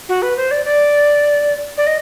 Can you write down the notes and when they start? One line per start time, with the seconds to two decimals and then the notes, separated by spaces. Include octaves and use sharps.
0.09 F#4
0.22 B4
0.36 C5
0.51 D5
0.64 D5
1.77 D5
1.86 D#5